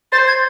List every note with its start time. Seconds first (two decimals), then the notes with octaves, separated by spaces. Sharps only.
0.12 C5 A6
0.27 G#6